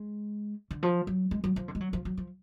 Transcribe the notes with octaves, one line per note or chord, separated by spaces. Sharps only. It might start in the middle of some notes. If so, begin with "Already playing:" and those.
Already playing: G#3
D3
F3
F#3
G#3
F#3
F3
D3
G#3
F#3
F3
F#3
F3